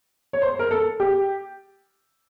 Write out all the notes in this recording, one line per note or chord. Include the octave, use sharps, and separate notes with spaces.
C#5
C5
A#4
A4
G4